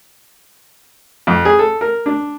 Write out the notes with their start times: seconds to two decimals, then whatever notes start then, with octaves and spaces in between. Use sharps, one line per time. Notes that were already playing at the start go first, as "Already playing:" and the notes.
1.27 F2
1.45 G#4
1.59 A4
1.81 A#4
2.06 D4